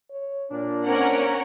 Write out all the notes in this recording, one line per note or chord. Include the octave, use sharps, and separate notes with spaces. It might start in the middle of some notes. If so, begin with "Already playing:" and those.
C#5
A#2 A#3 D4
C4 C#4 A#4 F#5